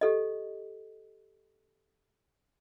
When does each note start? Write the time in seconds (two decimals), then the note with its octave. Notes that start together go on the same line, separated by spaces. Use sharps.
0.01 G4 A4 D#5